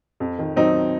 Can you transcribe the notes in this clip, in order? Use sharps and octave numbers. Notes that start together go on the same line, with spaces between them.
F2
D#3
F#3 C4 D#4